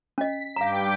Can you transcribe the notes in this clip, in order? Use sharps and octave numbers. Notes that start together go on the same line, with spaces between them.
C#4 D#5 B6
G2 F5 G5 A#5 D6